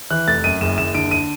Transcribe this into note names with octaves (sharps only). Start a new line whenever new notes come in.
E3 F#6
F1 A6
F#2 D#7
F#1 E7
F#1 E7
D3 D7
D#7